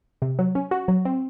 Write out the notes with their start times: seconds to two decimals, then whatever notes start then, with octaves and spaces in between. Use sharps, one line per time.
0.22 C3
0.39 F#3
0.55 C#4
0.71 F#4
0.88 F#3
1.05 C4